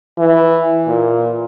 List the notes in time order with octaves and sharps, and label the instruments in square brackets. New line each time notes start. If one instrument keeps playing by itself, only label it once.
[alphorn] E3
A#2